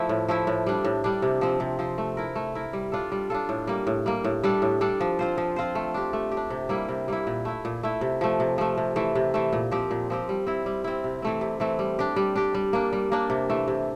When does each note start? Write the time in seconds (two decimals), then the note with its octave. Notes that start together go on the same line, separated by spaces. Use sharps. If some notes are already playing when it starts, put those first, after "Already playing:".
Already playing: F3 A3 E4
0.09 A2
0.29 F3 A3 E4
0.47 A2
0.67 G3 D4
0.84 A2
1.04 G3 D4
1.22 C3
1.41 F3 C4
1.60 C3
1.79 F3 C4
1.98 A3
2.17 E4 A#4
2.35 A3
2.55 E4 A#4
2.73 G3
2.92 D4 F4 A4
3.12 G3
3.30 D4 F4 A4
3.49 A2
3.67 G3 A#3
3.87 A2
4.06 G3 A#3
4.24 A2
4.44 G3 D4 A4
4.62 A2
4.81 G3 D4 A4
5.01 F3
5.19 C4 F4 C5
5.38 F3
5.56 C4 F4 C5
5.75 A3
5.94 D4 G4
6.13 A3
6.31 G4
6.37 D4
6.50 C3
6.69 G3 A#3 E4
6.88 C3
7.08 G3 A#3 E4
7.27 A#2
7.45 A3 E4
7.65 A#2
7.83 A3 E4
8.01 C3
8.21 F3 A3
8.40 C3
8.58 F3 A3
8.78 C3
8.96 E3 A3
9.15 C3
9.34 E3 A3
9.53 A#2
9.71 F3 C4 G4
9.91 A#2
10.10 F3 C4 G4
10.29 G3
10.47 C4 E4
10.66 G3
10.84 C4 E4
11.04 C3
11.22 E3 A3 C4
11.41 C3
11.60 E3 A3 C4
11.79 G3
11.99 D4 G4
12.16 G3
12.35 D4 G4
12.54 G3
12.73 A#3 D4
12.93 G3
13.12 A#3 D4
13.30 C3
13.50 E3 A3
13.68 C3